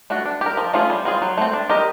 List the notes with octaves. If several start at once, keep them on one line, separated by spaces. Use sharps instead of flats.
A3 D4 F#4
D4
G4 A#4
F3
A3 C#4 F4 G#4
G3
C4 F4 G#4
F#3
A3 C4
D4
G4 A#4 D#5